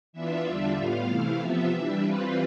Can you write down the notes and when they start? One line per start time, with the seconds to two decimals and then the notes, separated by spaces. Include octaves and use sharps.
0.13 E3 B3 D4 F4 E5
0.44 E2 D3 G3 D4 F4
0.76 A2 G3 B3 F4 F5
1.08 C3 E3 A3 E4
1.38 C3 F3 B3 F4 E5
1.70 E3 G3 D4
2.02 E3 G3 C4 F4 B4